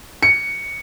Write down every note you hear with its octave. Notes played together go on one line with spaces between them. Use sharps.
C#7